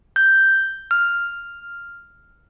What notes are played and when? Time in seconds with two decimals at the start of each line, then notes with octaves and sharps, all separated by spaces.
0.16 G6
0.91 F6